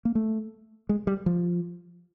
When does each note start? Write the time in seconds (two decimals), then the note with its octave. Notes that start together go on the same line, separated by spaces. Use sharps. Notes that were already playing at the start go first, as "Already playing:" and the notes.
0.05 A#3
0.15 A3
0.89 G#3
1.07 G3
1.26 F3